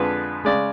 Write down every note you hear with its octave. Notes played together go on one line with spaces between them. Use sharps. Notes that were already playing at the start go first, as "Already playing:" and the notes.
Already playing: F2 D3 F3 G#3 B4
C#3 G#3 D5